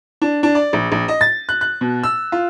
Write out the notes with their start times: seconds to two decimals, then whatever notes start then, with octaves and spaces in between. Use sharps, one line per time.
0.22 D4
0.43 D4
0.55 D5
0.73 A#1
0.92 A#1
1.08 D#5
1.21 A6
1.49 F#6
1.61 F#6
1.81 B2
2.04 E6
2.32 F4